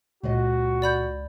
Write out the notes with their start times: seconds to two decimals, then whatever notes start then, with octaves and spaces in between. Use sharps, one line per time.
0.24 C#2 A#2 F#4 D#5
0.82 D5 B5 G6